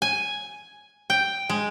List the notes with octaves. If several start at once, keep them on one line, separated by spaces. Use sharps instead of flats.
G#5
G5
G#3